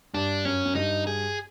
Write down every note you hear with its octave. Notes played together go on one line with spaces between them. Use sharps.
G2 D4
F#2 C#4
F#2
G2 D#4
G#4